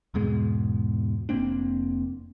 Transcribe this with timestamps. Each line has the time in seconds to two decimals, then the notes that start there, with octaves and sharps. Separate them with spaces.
0.14 E2 G#2 B2 G#3
1.29 F1 A#3 C4 D4